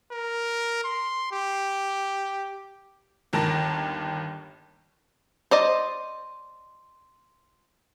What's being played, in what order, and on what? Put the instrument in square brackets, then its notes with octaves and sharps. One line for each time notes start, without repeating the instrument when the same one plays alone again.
[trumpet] A#4
C6
G4
[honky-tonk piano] G1 D#2 A#4 A5 A#6
[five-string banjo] C5 D5 D#5